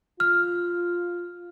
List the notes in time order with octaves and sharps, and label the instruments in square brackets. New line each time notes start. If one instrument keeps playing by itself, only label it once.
[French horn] F4 [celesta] F6